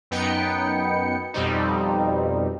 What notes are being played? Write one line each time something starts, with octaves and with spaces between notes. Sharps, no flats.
F#2 B3 D#4 G5 C#7
F2 B2 G3 C4 D#4